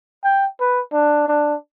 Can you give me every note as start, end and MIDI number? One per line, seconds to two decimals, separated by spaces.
0.24 0.46 79
0.60 0.82 71
0.93 1.27 62
1.28 1.55 62